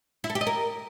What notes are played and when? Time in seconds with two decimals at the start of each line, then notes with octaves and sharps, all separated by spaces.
0.24 E4
0.30 A4
0.35 G4
0.41 D#5
0.47 A#4